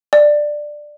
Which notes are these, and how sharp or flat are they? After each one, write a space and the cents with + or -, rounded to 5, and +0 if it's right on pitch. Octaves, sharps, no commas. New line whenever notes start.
D5 +10